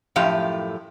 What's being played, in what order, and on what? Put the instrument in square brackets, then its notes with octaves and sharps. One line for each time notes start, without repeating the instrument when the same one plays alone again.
[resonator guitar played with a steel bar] F#2 A2 F3 G4 F5